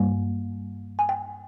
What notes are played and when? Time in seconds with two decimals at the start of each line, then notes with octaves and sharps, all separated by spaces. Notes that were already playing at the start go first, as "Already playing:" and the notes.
Already playing: G2 G3 A#3
0.99 G#5
1.09 G5